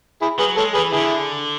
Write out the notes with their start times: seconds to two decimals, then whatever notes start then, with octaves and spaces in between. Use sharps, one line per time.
0.22 E4 G#4
0.39 F#3 G#4 B4
0.57 G#3 A4 C#5
0.74 E3 G#4 B4
0.92 D3 E4 G#4